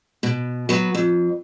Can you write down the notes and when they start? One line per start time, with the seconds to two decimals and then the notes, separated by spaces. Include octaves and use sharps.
0.23 B2
0.69 F#3 B3
0.95 F2